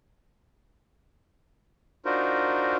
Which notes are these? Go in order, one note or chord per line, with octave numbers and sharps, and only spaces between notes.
D4 D#4 F4 F#4 A#4 C5